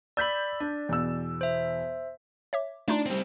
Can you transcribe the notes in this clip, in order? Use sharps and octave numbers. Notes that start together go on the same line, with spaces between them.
D5 B5 E6 G6 B6
D4 D5
E2 B2 E6
C5 E5
C#5 E5 D6
A3 D4 D#4 F4
G3 C4